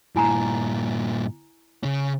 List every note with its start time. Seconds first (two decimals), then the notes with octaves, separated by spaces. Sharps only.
0.16 G2 A#2 E4 G#5 A#5
1.83 C#3 C#4